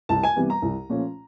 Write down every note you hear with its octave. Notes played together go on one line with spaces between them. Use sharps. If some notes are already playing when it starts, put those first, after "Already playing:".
C2 A5
G#5
C3 E3 G3 B3
A#5
C2
A#2 F3 A3 C#4